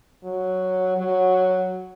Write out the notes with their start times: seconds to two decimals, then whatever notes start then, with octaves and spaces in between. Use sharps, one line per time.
0.24 F#3
0.97 F#3